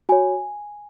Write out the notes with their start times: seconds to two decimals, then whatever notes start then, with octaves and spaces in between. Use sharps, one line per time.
0.09 F#4 C#5 G#5